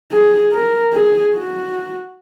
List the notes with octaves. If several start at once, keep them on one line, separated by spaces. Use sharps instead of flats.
G#4
A#4
G#4
F#4